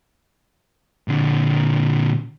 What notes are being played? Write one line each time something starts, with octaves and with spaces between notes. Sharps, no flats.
A#2 D3